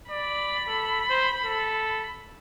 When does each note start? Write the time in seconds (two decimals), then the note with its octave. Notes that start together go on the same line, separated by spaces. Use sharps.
0.10 D5 B5
0.68 A4
1.10 C5
1.44 A4